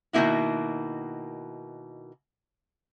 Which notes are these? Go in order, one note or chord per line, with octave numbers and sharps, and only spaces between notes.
B2 D#3 E3 A#3 E4 F#4